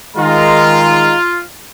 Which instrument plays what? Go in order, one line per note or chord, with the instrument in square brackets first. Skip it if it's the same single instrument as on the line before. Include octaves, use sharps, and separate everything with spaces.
[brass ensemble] D#3 G#3 A#5 [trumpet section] F4